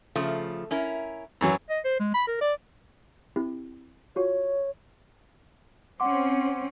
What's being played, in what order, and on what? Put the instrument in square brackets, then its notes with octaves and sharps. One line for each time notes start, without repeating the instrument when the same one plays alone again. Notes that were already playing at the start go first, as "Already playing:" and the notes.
[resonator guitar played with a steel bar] C#3 F3 A3
C#4 E4 A#4
[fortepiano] F#2 E3 F#3
[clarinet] D#5
C5
G#3
B5
A#4
D5
[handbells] C4 E4 G4
[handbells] F4 F#4 [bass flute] C#5
[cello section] C4 C#4 [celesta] F#5 C6 D6